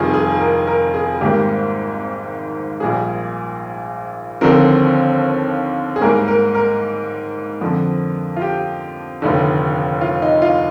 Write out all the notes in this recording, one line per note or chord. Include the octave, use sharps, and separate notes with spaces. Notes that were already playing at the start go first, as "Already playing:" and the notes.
Already playing: F1 F2 D#3 G3 F4 G#4
G#4
A#4
A#4
G#4
G#1 G#2 G3 A#3 G4
A#1 A#2 G3 G#4
D#2 D3 F3 C4 A#4
G#4
G#2 G3 A#3 A#4
A#4
A#4
F2 D3 F3
F4
G4
F1 D#2 D3
F4
D#4
F4